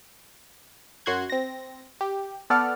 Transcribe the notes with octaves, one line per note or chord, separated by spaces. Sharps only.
F#2 F#4 C6 F#6 G#6
C4 A#6
G4
B3 A4 D5 F#5 F6